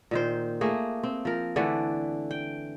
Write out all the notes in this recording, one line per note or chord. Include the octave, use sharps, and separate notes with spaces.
A#2 D#3 C5
A3 A#3 G#4
C4
F3 A#4
D3 E3 A3 D5
G5